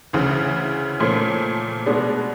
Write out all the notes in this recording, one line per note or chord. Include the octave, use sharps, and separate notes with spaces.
D2 C#3 E3
A#2 F3 A3 C#4
B2 G#3 B3 D4